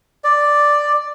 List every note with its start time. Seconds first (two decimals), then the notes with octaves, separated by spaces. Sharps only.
0.24 D5